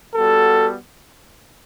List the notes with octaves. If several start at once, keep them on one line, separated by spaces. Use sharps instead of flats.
G3 B3 F#4 A4